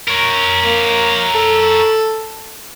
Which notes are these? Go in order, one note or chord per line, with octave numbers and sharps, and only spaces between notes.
A#4 C#5
A#3
A4